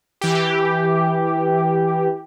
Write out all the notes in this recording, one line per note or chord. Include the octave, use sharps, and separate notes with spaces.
E3 G4